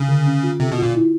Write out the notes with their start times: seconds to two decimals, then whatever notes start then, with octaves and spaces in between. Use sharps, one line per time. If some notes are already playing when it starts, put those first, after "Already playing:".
Already playing: C#3
0.08 D3
0.26 C#4
0.43 F4
0.60 C3 A4
0.72 B2
0.78 A#2 F4
0.95 E4